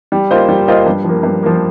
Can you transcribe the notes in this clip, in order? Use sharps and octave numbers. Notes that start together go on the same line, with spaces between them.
G3
A#3 F4 C5 D#5
G3
A#3 F4 C5 D#5
G2
F3 A#3
G2
F3 A#3